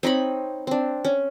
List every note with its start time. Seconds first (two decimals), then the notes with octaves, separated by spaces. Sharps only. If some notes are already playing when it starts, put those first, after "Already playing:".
0.03 C4 D#4 C#5 B5
0.67 C4 D4
1.05 C#4